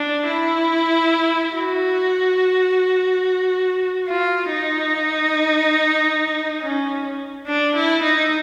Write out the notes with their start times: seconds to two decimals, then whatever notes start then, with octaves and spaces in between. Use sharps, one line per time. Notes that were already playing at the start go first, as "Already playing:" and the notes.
Already playing: D4
0.27 E4
1.54 F#4
4.08 F4
4.50 D#4
6.61 C#4
7.47 D4
7.75 E4
8.03 D#4